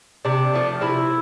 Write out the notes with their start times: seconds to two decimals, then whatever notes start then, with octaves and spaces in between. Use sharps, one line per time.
0.25 C3 D4
0.53 F3 A3
0.81 C3 E4